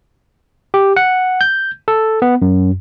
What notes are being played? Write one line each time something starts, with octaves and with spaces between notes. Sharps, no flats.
G4
F#5
G6
A4
B3
F#2